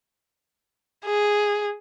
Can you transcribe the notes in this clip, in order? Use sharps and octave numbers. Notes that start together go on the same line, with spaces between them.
G#4